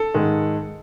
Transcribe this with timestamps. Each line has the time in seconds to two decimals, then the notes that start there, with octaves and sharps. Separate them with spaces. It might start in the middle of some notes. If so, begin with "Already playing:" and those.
Already playing: A4
0.14 G#2 D#3 G#3